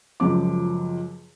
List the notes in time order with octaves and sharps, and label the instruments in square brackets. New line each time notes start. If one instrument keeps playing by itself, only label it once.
[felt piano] C#2 F#2 F3 D6